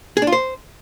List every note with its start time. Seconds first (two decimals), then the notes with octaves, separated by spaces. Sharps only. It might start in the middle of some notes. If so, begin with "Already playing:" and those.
0.17 G#4
0.22 D4
0.27 F4
0.32 C5